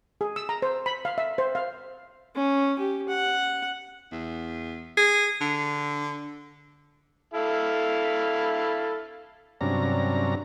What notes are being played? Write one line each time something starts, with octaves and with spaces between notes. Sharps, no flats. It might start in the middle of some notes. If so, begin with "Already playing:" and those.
G#4
E6
A#5
C5
B5
F5
E5
C5
F5
C#4
G4
F#5
E2
G#4
D3
E4 A4 F5
G2 C3 F#3 C#4 D4 A#5